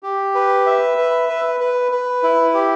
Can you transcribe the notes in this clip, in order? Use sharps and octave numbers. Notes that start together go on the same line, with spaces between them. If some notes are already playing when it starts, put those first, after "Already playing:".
G4
B4
E5
B4
B4
B4
B4
E4
G4